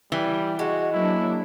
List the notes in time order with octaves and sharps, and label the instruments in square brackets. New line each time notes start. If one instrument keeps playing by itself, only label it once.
[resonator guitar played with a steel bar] E3 [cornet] G3
[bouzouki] G#3 [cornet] F#4
[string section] F#3 A#3 D4 [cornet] E4